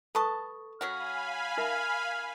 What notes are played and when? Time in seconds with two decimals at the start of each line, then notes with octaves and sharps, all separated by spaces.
0.15 A4 B4 A5 C#6 D#6
0.81 F#3 C#4 F#4 F5 G#5 B5 F6
1.57 D#4 A#4 E5 F6